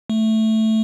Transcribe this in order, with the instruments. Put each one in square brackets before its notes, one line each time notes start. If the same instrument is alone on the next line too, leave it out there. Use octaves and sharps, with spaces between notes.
[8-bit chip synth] A3